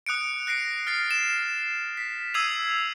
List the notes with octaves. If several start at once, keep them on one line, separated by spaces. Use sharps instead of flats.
D#6 F#6 C#7 D7
F#6 A#6 C7 D7
F6 A6 C7
E7
B6
D#6 E6 G#6 C7 D#7 F7